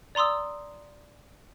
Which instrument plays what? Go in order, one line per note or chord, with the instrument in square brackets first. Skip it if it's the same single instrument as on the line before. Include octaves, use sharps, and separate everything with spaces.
[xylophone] D5 A#5 C6 D#6 E6